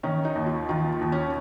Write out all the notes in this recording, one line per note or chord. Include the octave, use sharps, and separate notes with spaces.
D#3 C#4
D#4
D#2
F4
D#3 F4
D#2
C#4